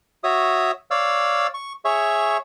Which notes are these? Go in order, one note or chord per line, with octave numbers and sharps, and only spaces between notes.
F#4 C#5 E5 D#6
C#5 D5 F5 E6
C#6
G#4 C#5 E5 C#6